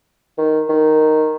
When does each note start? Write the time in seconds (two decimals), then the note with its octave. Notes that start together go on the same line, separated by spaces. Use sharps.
0.38 D#3
0.69 D#3